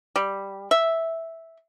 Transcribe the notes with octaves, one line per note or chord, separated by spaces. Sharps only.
G3
E5